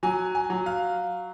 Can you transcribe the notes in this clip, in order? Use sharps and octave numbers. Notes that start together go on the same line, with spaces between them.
F#3 G#5
G#5
F#3
F5